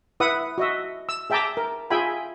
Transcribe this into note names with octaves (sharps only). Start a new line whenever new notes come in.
E4 B4 E5 F#5 D#6
F#4 D#5 E5
E6
G#4 E5 G5 A5 A#5 D6
A#4
F4 G#4 E5 G5 G#5 B5